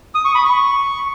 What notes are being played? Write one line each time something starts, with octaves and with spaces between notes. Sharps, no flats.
D#6
C#6
B5
C#6